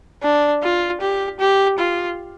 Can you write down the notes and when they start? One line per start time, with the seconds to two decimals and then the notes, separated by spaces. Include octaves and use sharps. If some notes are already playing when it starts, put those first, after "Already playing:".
0.23 D4
0.63 F4
1.01 G4
1.40 G4
1.79 F4